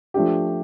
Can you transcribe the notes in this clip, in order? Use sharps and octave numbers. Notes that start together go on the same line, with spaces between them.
F3 A3 D4 G4